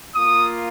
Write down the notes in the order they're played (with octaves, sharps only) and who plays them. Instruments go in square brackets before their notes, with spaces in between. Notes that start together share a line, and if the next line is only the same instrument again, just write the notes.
[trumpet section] A#3 F4 D#6